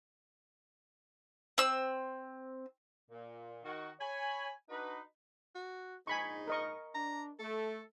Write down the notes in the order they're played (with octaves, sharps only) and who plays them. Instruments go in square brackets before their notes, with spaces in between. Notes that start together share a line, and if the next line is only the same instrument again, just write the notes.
[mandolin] C4 E6
[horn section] A#2
D#3 F#4
C#5 G#5 B5
D4 D#4 F#4 B4
[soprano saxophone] F#4
[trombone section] A#1 G#2 [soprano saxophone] D#4 [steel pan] G#5 B5 C#6
[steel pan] A#4 D#5 C#6
[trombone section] D4 [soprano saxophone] A#5
[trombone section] A3 [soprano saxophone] A4